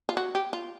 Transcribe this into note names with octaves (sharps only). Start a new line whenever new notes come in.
F4
F#4
G4
F4